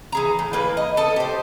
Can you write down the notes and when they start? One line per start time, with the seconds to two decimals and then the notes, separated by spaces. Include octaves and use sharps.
0.12 E3 G#4 A#5
0.39 A2
0.53 E3 A#3 B4
0.77 D#5
0.97 A4 D#5
1.16 G4 C5